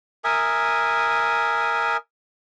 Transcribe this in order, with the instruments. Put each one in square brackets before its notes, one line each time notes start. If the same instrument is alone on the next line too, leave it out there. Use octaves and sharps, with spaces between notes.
[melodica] A#4 E5 G#5 D#6